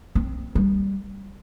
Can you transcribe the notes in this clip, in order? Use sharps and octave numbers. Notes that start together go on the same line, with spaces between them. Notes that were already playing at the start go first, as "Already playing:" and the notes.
C4
G3